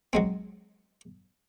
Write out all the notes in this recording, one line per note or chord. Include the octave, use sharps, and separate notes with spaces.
F#3 G#3 C4